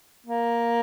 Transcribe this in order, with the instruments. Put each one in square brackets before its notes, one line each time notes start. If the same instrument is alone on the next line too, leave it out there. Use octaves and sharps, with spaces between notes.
[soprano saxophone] A#3